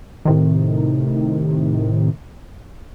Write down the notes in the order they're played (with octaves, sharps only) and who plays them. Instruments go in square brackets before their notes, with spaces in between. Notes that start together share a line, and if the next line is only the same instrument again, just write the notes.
[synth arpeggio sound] A2 C3 D#3